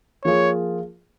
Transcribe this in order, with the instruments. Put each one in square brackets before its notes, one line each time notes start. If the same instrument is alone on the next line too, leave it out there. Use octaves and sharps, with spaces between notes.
[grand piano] F3 A#3 F4 G#4 [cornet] C#5